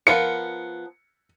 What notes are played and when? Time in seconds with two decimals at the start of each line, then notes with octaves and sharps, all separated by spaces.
0.07 F3 B3 A#4 C#7